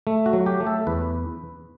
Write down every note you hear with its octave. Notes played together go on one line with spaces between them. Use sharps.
A3
F#4
F#3
G4
A3
A4
E2 B4